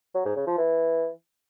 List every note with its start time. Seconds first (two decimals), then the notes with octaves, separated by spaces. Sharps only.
0.14 F#3
0.25 G#2
0.36 C#3
0.47 F3
0.58 E3